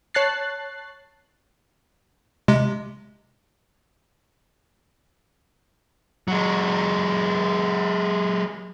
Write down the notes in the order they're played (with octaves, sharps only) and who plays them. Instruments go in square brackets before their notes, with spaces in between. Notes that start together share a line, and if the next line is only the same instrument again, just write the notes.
[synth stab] C#5 A5 F#6 A6 C7
[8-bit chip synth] C3 G#3
[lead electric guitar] F#3 G#3